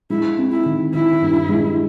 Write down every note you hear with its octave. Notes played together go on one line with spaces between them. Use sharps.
G#3 E4
C4
E4
D#3
D#3 E4
G2
G#3